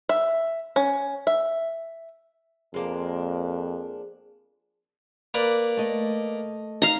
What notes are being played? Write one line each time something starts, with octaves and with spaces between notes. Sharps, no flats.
E5
C#4
E5
F2 G#3 A#3 D4
A#3 B4 D5
A3 D#5
D#4 F5 A#5